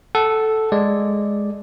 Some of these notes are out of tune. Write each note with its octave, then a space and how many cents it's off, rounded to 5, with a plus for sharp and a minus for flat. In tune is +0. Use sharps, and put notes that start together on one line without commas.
A4 -5 F#5 +20
G#3 +0 D5 +0